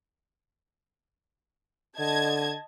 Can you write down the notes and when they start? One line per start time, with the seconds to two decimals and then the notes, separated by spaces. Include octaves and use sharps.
1.99 D3 D#5 A5 G#6